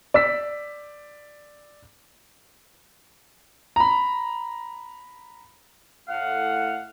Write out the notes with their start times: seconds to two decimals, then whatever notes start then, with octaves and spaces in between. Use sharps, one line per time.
0.14 D5 E6 B6
3.76 A#5 B5
6.08 A2 F5 F#5